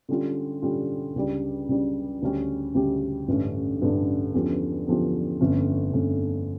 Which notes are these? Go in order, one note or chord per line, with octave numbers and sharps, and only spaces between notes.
D3 G3 C#4 F4
D3 G3 C#4 F4
C#2 C#3 G3 D4
C#2 C#3 G3 D4
D2 C#3 G3 C#4 G4
D2 C#3 G3 C#4 G4
A1 G2 D3 A3 C#4
A1 G2 D3 A3 C#4
E2 D3 F3 C#4 G4
E2 D3 F3 C#4 G4
G1 F2 D3 A3 C#4
G1 F2 D3 A3 C#4